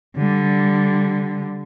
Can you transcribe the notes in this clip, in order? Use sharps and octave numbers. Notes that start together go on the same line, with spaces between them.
D3 G3